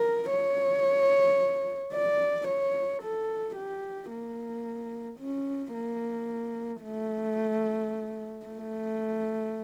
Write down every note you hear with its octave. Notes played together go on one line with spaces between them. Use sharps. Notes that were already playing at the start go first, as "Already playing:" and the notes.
Already playing: A#4
C#5
D5
C#5
A4
G4
A#3
C#4
A#3
A3
A3